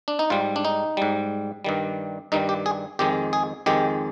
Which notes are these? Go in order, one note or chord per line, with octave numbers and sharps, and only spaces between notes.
D4
D#4
G#2 G3 F4
D4
D#4
G#2 G3
G2 D#3 G3
G2 D#3 G3 D#4
G4
G#4
F2 D#3 G#3 G4
G#4
F2 D#3 G#3 G4